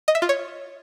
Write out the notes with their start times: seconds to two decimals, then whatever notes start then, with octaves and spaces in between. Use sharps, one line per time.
0.08 D#5
0.15 E5
0.22 F4
0.29 C#5